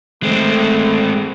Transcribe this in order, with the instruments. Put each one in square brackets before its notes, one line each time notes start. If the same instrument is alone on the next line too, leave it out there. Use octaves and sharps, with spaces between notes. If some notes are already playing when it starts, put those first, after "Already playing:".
[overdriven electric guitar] G#3 C4 [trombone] A3